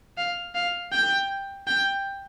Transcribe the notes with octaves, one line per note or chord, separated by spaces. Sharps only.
F5
F5
G5
G5